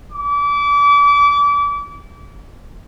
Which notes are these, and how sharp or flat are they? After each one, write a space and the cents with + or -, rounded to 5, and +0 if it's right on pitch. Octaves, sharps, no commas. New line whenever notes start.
D6 -30